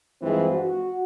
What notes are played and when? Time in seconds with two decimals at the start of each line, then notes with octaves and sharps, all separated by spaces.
0.22 G2 E3 F3 G#3 C4 F4
0.53 F#4